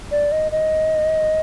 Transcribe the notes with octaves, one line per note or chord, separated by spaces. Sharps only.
D5
D#5
D#5